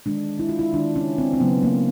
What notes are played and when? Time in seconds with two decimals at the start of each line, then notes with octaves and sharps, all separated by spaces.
0.06 D#3 G#3 D4
0.39 E4
0.49 F4
0.59 E4
0.73 D#3 G#3 D4
0.96 C#4
1.18 C4
1.33 C4
1.40 C#3 F#3 A#3 B3
1.63 A#3